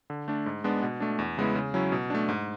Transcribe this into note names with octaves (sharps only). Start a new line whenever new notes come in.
D3
A3 D4
G#2
G#3 B3 D4
B2
A3 D4
E2
C#3 G#3 B3 E4
C#3
F#3 C#4 E4
B2
A3 D4
G#2